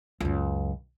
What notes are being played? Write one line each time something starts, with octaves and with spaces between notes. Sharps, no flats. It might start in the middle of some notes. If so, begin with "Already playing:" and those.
C#2 F#2